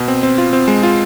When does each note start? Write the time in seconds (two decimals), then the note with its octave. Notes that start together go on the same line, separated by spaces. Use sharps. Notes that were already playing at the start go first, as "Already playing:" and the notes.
Already playing: B2
0.08 C4
0.23 C4
0.38 F4
0.53 C4
0.68 G#3
0.83 F4